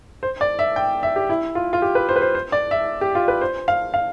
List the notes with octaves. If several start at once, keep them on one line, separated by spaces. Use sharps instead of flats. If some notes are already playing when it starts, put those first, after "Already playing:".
C5
D5
E5
G5
E5
G4
E4
F4
F4
G4
B4
C5
B4
C5
C5
D5
E5
G4
F4
B4
C5
F5
F5